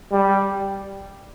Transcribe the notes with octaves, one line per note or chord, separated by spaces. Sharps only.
G3